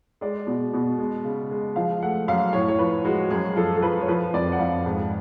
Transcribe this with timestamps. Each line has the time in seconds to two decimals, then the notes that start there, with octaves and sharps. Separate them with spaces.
0.21 G#3 D5
0.47 B2
0.73 B2
0.98 G#3
1.25 C#3
1.51 G#3
1.76 F3 F5
2.02 A3 F#5
2.28 F#2 F5
2.53 A2 C#5
2.68 C#5
2.79 F3 B4
3.05 G#3 F#4
3.30 F#2 G#4
3.56 F3 A4
3.77 A4
3.82 F3 B4
4.00 C#5
4.08 F3 B4
4.34 F2 D5
4.52 F#5
4.59 F2 F5
4.86 G#2